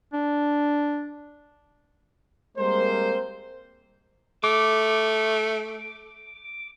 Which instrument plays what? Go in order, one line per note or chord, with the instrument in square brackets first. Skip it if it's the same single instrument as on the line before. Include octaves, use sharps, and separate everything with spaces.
[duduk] D4
[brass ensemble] G3 G#3 A#3 C4 A#4 C5
[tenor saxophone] A3 [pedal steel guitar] D6